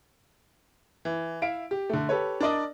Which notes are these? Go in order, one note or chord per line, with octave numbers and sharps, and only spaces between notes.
E3
E4 E5 F5 D7
G4
D3 A3
G4 A4 B4 C#5
D4 A#4 D5 D#5